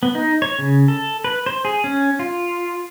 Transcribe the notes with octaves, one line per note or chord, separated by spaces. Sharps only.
B3
D#4
C#5
C#3
A4
B4
C5
G#4
C#4
F4